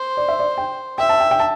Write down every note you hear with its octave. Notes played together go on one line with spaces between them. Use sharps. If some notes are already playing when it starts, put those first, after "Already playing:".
Already playing: C5
D5
E5
D5
G5
E5 G5
A5
G5
G5
A5